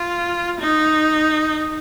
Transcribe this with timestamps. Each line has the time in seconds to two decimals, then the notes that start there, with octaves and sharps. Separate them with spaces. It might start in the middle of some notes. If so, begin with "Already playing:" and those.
Already playing: F4
0.60 D#4